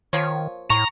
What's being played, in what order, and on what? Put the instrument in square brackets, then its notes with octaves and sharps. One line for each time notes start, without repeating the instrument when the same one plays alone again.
[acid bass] D#3 [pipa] F3 A#3 C#5
[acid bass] A2 [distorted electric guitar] A#5 [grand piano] C#6